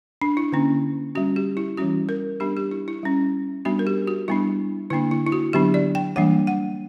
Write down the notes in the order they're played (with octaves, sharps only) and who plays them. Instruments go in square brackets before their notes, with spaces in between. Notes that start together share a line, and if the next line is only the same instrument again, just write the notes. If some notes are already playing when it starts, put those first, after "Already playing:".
[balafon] D4
E4
D3 A#3 C#4
G3 C#4 F#4
G4
E4
E3 G3 C#4 F#4
A#4
G3 B3 D4 G4
G4
E4
E4
G3 C#4
G3 B3 D4 F#4
A#4
G4
F#4
G3 B3 D4 E4
D3 A#3 D4 E4
E4
E4
F#4
D3 F#3 B3 D4 G4
D5
G5
E3 G3 A#3 D4 F#5
F#5